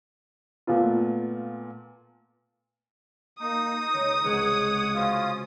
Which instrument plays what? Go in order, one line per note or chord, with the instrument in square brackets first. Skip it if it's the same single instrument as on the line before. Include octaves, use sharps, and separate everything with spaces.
[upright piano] A#2 A3 B3 F4
[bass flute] A#3 [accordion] D#4 [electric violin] D#6
[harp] C#2 A#6 C#7 [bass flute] C#5
[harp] C#2 C3 G#3 [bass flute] G#4 [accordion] C#5 F#5
[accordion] C#4 F4 [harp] F#4 C5 [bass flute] F5